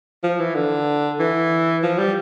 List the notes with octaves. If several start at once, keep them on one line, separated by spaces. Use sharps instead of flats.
F3
E3
D3
E3
F3
G3